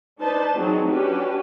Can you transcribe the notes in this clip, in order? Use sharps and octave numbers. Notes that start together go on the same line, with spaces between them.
D4 D#4 B4 C5 A5
E3 F#3 C4 D#4 G#4
C#4 D4 F#4 G4 B4